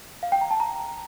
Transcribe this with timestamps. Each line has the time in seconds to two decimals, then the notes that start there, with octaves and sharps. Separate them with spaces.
0.23 F5
0.32 G5
0.41 A#5
0.51 A5
0.60 A#5